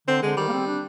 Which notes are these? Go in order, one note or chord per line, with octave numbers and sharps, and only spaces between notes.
D3 C4
D3 G#3
D#3 G3
A#3
C4
D4